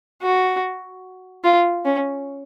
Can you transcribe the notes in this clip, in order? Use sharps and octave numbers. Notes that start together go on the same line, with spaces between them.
F#4
F4
C#4